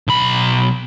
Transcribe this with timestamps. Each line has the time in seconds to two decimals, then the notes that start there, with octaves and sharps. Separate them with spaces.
0.08 B1 B5